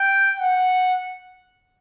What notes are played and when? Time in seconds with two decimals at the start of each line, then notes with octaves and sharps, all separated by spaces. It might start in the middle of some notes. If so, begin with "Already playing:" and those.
Already playing: G5
0.39 F#5